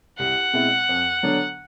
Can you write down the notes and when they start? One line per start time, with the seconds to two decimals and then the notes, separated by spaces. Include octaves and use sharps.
0.19 C2 F#5
0.53 B2 G#3 C4 E4
0.89 F2
1.23 D3 F#3 B3 D4